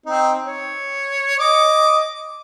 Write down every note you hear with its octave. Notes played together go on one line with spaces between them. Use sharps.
C4 D#4
C#5
D#5 D6